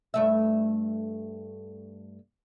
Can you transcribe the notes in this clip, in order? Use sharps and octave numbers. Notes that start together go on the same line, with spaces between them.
G2 A3 E5